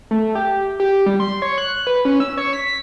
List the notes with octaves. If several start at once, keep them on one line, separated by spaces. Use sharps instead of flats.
A3
G4
G4
G3
C6
C#5
F#6
B4
C#4
E6
C#5
B6